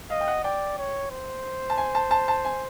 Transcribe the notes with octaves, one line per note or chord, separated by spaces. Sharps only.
D#5 F5
G5
F#5
D5 G5
C#5
C5
A5
G#5
A5
A5
A5
G#5